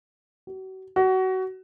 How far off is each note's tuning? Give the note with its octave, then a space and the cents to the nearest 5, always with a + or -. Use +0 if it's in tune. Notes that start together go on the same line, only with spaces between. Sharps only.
F#4 +40
F#4 +25